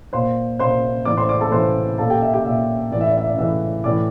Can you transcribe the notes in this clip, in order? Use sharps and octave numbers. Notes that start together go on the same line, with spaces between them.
A#2 C5 C6
A#2 C5 C6
A2 E3 D5 D6
C5 C6
D5 D6
A4 A5
A2 E3 C5 C6
A#2 A4 A5
G4 G5
E5
G4 G5
A#2 E5
A2 E3 D5
E5
D5
E5
D5
A2 E3 E5
A2 E3 D5 D6